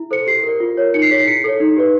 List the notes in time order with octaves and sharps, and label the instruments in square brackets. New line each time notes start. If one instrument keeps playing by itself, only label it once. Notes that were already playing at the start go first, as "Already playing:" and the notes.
Already playing: [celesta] E4
A4 C5 C#7
G4 C7
A#4
D5
F4
A#4 C#5
D#4 C#7
C7
G#4 C#5 B6
C7
E4 C#7
A4 C#5
D#4
G4 B4 D5